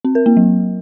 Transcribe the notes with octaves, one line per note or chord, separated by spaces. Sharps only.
C4
A#4
A#3
F#3